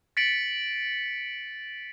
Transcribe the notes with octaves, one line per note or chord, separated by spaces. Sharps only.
A6 B6 C#7 D7 F#7